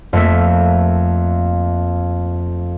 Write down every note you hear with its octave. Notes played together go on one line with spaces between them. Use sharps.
F2 A3 A#3 E5